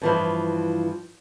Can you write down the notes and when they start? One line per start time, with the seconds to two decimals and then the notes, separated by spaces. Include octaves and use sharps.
0.01 G2 E3 F3